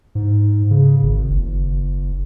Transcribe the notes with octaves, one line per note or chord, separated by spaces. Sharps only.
G#2
C#3
G#1
F#1